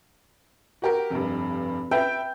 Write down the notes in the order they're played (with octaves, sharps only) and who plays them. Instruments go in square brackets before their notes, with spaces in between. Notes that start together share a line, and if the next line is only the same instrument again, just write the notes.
[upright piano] F#4 G4 A#4
F1 G2
B4 E5 G5 G6